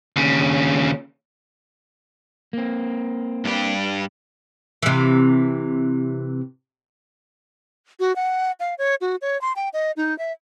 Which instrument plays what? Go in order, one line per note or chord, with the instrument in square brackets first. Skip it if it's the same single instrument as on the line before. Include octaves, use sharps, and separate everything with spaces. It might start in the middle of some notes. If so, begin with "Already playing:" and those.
[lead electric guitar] D#2 C#3
[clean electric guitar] A#3 C4
[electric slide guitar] G2 G4
[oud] C3 E3
[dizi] F#4
F#5
F5
C#5
F#4
C#5
C6
G5
D#5
D#4
E5